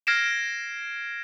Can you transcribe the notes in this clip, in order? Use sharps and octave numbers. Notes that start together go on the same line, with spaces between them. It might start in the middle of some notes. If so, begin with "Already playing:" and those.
F6 G#6 A#6 C7 D7 E7